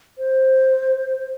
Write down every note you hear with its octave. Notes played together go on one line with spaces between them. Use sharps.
C5